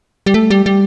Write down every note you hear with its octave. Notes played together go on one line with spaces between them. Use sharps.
G3
A3
G3
G3